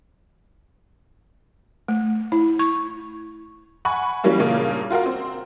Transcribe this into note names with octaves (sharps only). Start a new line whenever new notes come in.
A3
E4
C#6
F#5 G#5 B5 C#6
E3 F#3 G3 A#3 C#4
G2 A#2 C#3 A#3
F4 F#4 A#4 F5
C4